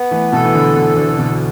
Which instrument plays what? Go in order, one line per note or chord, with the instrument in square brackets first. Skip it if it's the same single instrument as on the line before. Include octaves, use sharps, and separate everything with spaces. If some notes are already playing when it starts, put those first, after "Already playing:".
Already playing: [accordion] B3
[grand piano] E3 A3
[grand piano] B2 E3 [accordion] A4
[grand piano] E3
D3
[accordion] D2 [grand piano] B2
[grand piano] D3
D3
[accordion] D2 [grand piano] B2